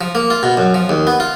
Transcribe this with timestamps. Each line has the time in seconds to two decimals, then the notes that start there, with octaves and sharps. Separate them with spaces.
0.01 F3
0.15 A#3
0.30 F4
0.43 B2
0.57 F#2
0.74 F3
0.89 D#2
1.07 B3
1.20 F4